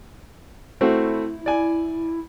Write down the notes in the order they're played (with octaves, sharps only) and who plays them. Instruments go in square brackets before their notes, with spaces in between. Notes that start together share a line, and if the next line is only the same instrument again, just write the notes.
[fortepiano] A3 C4 F#4 [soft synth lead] E4
[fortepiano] D5 G#5